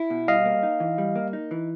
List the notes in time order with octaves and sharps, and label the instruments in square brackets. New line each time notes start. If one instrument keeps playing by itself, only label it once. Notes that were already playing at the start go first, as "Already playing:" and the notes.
Already playing: [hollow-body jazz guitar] E4
B2
[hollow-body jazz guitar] G3 [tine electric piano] D#5 F5
[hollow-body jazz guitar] A#3
D#4
E3
G3
A#3
D#4
E3